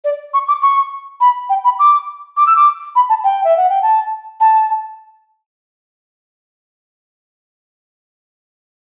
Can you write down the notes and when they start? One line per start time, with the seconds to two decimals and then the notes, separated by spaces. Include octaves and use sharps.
0.04 D5
0.34 C#6
0.48 D6
0.62 C#6
1.21 B5
1.49 G5
1.64 B5
1.79 D6
2.37 D6
2.47 E6
2.56 D6
2.95 B5
3.09 A5
3.24 G5
3.44 E5
3.57 F#5
3.69 G5
3.82 A5
4.40 A5